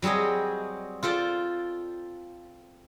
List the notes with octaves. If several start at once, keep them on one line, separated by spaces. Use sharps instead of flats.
F#3 G3 C4 G#4 D#5
F4 A4 C5 D5